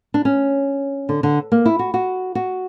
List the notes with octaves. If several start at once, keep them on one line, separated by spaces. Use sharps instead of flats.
D4
C#4
D3
D3
A#3
E4
F#4
F#4
F#4